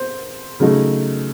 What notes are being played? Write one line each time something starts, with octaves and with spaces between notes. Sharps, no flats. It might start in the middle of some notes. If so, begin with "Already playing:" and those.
Already playing: C5
C#3 F#3 A3 D#4